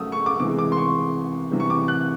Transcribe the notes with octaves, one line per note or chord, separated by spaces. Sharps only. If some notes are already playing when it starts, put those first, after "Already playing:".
Already playing: C#3 F#3 A3 D#6 E6
C#6
D6
C3 E3 G#3 D6
D6
C6
C#6
C3 E3 G3
C#6
D6
F#6